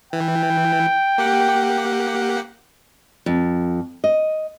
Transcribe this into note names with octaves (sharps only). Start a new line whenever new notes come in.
E3 G5
A#3 G4 F#5
F2
D#5